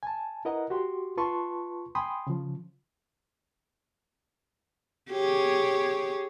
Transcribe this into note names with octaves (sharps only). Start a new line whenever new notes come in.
G#5 A5
E4 A#4 B4 D#5 F#5 A#5
F#4 G4 C6
F4 B4 A5 C6 C#6
G5 G#5 B5 C6 D#6
C#3 F3
G4 G#4 C#5